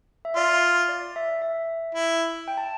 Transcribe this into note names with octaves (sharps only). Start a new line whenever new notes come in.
E5
F4 D5
D5
E5
E5
E4
G5
A5